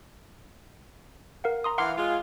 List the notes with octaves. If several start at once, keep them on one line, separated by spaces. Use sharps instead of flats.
A#4 F5 F#5
A#5 C6 D#6
E3 F5 F#5 C6 D6
G#3 F4